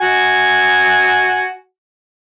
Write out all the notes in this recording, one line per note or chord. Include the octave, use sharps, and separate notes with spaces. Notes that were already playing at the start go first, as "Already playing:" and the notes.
F#4 G#5